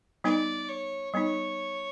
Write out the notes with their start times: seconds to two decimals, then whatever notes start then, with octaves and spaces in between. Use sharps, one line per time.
0.24 G3 B3 D#4 D5
0.69 C#5
1.14 G3 B3 D#4 C#5